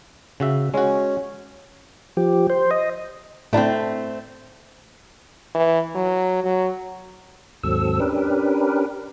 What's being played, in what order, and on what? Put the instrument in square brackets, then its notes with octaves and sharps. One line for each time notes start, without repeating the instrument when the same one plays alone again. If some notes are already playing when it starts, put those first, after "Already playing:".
[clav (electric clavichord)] C#3 F#4 E5
[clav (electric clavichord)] G#3 F#4 [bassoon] C#4
[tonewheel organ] F3 G4
C5
D#5
[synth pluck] A2 D4 E4 [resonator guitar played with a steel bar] A3 C4
[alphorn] E3
F#3
F#3
[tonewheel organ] D#2 G#2 F#3 C4 A4 E6
C#4 D4 G4 A#4 B4